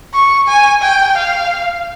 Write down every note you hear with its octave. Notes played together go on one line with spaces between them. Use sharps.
C#6
G#5
G5
F5